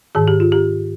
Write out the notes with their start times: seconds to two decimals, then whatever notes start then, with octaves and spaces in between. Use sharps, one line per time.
0.15 G#2 D#3 G#4
0.28 G4
0.40 F4
0.52 G4